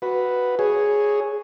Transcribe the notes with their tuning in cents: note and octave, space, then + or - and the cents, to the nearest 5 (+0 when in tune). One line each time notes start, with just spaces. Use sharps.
F#4 +0 B4 +0
G#4 +0 C#5 -5